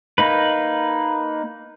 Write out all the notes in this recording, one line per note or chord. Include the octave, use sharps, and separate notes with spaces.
A#3 D#4 B4